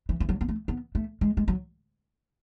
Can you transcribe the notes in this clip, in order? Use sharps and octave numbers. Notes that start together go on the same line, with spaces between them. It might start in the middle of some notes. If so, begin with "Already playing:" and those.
E3
E3
F#3
B3
A3
B3
A3
G#3
G#3
F#3